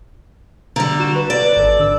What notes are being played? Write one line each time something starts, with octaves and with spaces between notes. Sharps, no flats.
D3 G3 A#5
F#4 E7
B4
D5
G#1 A4
D3 E6